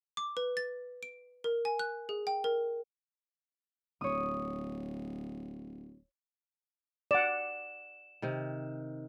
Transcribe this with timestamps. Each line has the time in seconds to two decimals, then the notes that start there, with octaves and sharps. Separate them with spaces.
0.17 D6
0.37 B4
0.57 A6
1.03 D7
1.44 A#4
1.65 G#5
1.79 F#6
2.09 G#4
2.27 G5
2.44 A#4
4.01 D1 C#5 D#6
7.11 D5 F#5 E7
8.22 C3 D#3